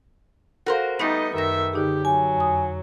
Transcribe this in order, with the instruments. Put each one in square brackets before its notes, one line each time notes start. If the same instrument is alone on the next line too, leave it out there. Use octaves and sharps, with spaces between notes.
[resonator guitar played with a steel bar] F#4 A#4 C5 [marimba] A4 F5
[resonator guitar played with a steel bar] G3 A3 B3 [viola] D#4 D#5
[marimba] F#2 A#6 [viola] D#3 E5
[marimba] D3 D#4 G#4 [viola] G4
[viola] F#3 [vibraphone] G#5
[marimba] F2 D#6